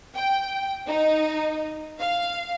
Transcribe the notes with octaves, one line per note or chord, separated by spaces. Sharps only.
G5
D#4
F5